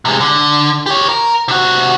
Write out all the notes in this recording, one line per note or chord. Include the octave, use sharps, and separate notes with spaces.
C3 G#3
D3
G4 C#5
A#4
C3 F#4